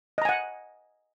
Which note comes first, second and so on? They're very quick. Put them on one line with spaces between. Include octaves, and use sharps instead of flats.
D#5 A#5 G#5 F#5